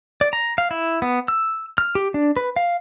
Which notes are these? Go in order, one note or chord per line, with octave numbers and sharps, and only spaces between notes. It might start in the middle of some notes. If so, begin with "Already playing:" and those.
D5
A#5
F5
E4
B3
E6
F6
G4
D4
B4
F5